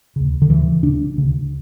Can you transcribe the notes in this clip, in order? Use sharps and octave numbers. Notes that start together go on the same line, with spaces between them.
D2 C#3
D3
D2 C#3 E3
D2 C#3 D4
D2 C#3